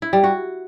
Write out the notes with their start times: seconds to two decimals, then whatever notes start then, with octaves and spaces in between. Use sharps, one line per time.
0.02 E4
0.13 G3
0.24 F#4